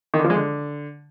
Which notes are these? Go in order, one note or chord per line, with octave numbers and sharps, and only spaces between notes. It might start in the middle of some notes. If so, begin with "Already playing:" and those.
D#3
D3
F3
G#3
D3